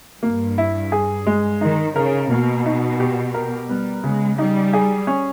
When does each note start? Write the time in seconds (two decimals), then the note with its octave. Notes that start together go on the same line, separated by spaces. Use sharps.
0.23 G2 A#3
0.58 E4
0.92 G#4
1.27 G#3
1.61 D#3 D#4
1.96 C#3 A#4
2.31 B2 A#3
2.66 D#4
3.00 G4
3.34 A#4
3.69 G3 B3
4.04 C#3 G#3
4.38 G3 D#4
4.73 G#4
5.07 C#4